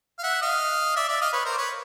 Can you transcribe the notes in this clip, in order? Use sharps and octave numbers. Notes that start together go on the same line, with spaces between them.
F5
E5 F#5
D#5 F5
D5 E5
D5 E5
D#5 F5
B4 C#5
A#4 C5
D5
B4 C#5